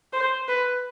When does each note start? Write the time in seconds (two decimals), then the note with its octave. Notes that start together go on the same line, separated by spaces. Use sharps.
0.13 C5
0.48 B4